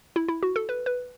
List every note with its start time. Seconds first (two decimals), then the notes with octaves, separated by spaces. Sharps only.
0.16 E4
0.29 E4
0.43 F#4
0.56 A4
0.69 B4
0.86 B4